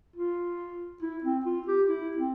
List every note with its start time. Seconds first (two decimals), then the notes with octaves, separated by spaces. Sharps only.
0.16 F4
1.02 E4
1.24 C4
1.46 F4
1.68 G4
1.89 E4
2.17 C4